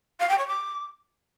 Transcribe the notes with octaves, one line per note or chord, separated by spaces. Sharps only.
F5
G5
C#5
D6